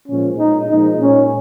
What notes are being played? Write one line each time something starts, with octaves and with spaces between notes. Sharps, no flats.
A#2 F3 G#3 C#4
A#2 G#3 D#4
A#2 F3 G#3 D#4
A#2 G#3 C#4